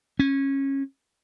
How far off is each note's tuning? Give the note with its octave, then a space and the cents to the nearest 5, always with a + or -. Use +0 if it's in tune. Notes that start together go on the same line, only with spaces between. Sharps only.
C#4 -20